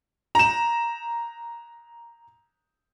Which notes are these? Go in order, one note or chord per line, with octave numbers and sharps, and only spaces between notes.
A#5 E7